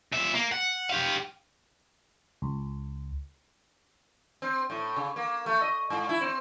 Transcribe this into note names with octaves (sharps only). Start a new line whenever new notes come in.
A#2 E5
A#3
F#5
G4 F5
C#2
C4
A2
C#3
A#3
A3
D#5
G#2
E4
C4